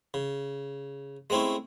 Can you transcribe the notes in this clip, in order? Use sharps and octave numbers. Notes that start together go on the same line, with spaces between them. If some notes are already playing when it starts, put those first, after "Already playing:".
C#3
G#3 A3 C4 C#4 E4